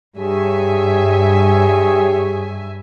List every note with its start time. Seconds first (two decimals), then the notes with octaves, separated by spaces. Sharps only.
0.17 G2 G4 G#4 C#5 E5 G#5